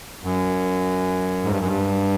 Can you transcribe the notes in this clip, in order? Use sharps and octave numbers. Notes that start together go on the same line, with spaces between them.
F#2
G#2
G2
F#2
G2